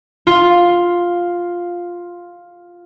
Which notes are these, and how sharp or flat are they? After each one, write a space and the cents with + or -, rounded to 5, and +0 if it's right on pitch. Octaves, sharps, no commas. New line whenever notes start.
F4 +5